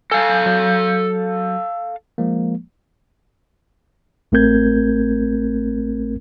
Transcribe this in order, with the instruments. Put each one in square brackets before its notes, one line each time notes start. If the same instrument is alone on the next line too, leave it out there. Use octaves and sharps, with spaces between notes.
[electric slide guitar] A4 F5 [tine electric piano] G#5
[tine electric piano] F#3
F3 G#3 A#3
A1 A3 C4 A#4 G6 G#6